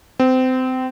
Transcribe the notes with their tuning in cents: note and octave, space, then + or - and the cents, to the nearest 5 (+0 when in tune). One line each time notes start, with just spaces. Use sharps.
C4 -25